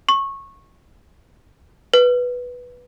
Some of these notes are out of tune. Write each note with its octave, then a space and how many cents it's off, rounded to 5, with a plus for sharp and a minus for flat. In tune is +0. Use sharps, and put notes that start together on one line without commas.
C#6 -20
B4 -5